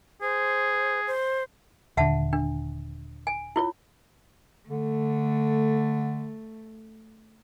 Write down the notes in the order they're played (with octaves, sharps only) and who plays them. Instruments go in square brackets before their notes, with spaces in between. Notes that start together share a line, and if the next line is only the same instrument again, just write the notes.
[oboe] G#4 [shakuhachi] C5
[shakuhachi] C5
[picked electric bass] D#1 D3 [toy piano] E5 F#5 A5
[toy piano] D4
G#5
E4 F4 C#5
[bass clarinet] D3 [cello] A3